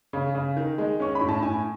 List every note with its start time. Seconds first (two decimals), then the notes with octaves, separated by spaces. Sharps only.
0.13 C#3
0.35 C#3
0.57 D#3
0.78 G#3
1.00 C#4 C#6
1.15 B5
1.21 A2
1.29 A5
1.42 A2 G#5